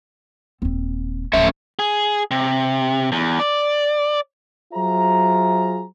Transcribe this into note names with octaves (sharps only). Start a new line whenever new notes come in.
D#1 C4
D1 F3 A3 C#4 E5
G#4
C3
E2
D5
F#3 F4 G#4 C5 E5 A#5